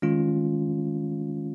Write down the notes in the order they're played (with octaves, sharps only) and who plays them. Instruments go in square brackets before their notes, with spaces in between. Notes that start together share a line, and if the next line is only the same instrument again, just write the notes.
[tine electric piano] D#3 G#3 C#4 F4